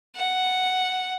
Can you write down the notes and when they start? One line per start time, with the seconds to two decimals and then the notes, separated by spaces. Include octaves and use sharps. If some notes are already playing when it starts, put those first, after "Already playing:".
0.16 F#5